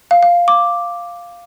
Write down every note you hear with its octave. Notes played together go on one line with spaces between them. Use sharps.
F5
F5
D6